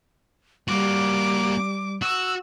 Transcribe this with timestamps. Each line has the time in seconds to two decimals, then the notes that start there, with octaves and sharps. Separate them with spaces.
0.68 G3 A#3 F#4 D6
2.02 F#4 E6